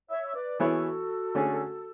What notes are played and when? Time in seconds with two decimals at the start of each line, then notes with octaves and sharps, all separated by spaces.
0.10 C#5 E5
0.26 E5
0.35 B4 D5
0.60 E3 B3 E4 F#4 G#4 A4 C#5
1.35 D3 A3 C#4 G#4